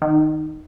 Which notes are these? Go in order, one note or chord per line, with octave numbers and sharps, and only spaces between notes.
D#3